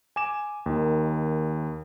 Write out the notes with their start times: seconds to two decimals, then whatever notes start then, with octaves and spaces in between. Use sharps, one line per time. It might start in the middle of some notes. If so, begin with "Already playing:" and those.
0.16 G#5 D6 E7
0.66 D#2 D#3